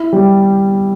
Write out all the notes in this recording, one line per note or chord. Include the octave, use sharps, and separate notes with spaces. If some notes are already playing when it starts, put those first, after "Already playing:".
Already playing: E4
G3